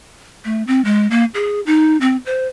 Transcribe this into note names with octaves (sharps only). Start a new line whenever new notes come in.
A3
C4
G#3
A#3
G#4
D#4
C4
C5